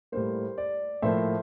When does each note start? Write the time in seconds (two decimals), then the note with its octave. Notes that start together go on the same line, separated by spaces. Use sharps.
0.12 A2 G3 A#3 C5
0.58 D5
1.02 A2 F3 A#3 C5 E5